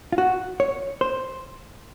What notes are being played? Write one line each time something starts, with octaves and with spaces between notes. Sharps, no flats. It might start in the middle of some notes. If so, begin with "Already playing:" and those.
F4
F#4
C#5
C5